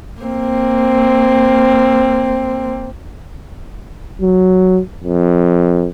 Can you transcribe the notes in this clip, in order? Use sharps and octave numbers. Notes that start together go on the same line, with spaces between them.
A#3 C4
F#3
F2